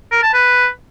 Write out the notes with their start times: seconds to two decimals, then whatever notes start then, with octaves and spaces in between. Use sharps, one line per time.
0.12 A#4
0.23 A5
0.33 B4